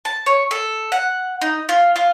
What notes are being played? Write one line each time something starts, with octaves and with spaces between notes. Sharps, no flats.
A5
C#5
A4
F#5
D#4
F4
F4